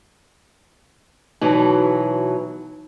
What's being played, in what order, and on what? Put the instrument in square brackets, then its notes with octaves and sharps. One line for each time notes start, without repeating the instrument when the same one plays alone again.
[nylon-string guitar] B2 E3 F#3 [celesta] D#4 A5